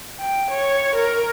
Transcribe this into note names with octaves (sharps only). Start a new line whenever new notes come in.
G5
C#5
A#4